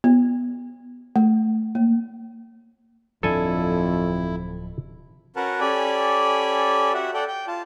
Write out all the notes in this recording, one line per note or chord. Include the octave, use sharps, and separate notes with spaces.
B3
A3
A#3
D1 F2 F3 D4 E4 A4 G#5
C#4 F#4 A#4 B4 F#5 A5
C#4 G4 A4 D5 G#5 B5
F#4 G4 E5 F#5
A4 D5 F#5 G5
G5
F4 A5